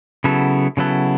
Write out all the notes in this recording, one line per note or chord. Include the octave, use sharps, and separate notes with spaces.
C#3 F#3 B3 E4 A4
C#3 F#3 B3 E4 A4